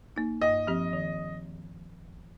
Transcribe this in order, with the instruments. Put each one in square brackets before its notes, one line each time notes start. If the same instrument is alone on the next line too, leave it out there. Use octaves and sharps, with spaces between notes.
[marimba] A#3 D#4
[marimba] G2 [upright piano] D#5
[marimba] F3 C4 G4
D#3